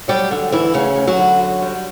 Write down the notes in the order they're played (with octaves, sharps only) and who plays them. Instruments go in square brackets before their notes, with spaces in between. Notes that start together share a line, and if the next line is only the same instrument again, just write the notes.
[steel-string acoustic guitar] F#3 G3 G4
D3
E2 E3 E4
D2 C#3 C#4
D2
F#3 F#4
D3
F#2
G3